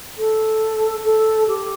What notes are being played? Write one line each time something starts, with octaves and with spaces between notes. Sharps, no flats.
A4
A4
G4